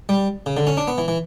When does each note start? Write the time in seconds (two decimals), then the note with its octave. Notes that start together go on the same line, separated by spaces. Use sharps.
0.09 G3
0.46 C#3
0.57 D3
0.67 C#4
0.77 D4
0.88 B3
0.98 E3
1.08 E3